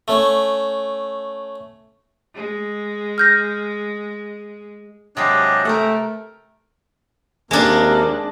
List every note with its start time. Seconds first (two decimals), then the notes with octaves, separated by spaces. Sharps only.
0.08 A3 C#4
2.35 G#3
3.18 F6 G6 A#6
5.17 C3 F#3 G#3 D4 G4 D#5
5.65 A3 A#4 F#5 G5
7.51 D#2 C3 G#3 A#3 D4